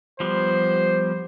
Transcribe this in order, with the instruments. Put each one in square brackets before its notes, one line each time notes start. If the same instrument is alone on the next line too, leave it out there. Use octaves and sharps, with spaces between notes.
[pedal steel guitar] F3 G3 B3 [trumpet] C5